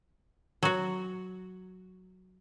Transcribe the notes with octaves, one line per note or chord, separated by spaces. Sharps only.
F#3 F#4